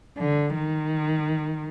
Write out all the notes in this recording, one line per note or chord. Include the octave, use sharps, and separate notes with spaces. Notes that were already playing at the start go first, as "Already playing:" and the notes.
D3
D#3